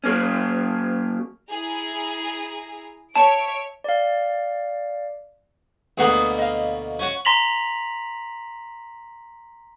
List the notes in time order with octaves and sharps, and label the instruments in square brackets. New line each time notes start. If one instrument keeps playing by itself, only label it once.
[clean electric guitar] F#3 A#3 C#4
[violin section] E4 G#4 A#5
[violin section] C#5 E5 D7 [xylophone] A5
[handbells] D5 F5
[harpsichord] D2 B2 A#3 [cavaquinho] G#4 F#5 D#6
[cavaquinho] D#5 F5
[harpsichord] C#4 F#4
[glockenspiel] A#5 C6 A#6 B6 F7 F#7